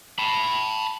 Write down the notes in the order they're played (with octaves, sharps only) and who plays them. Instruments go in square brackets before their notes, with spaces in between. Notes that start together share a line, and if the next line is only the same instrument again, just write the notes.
[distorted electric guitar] A5 B5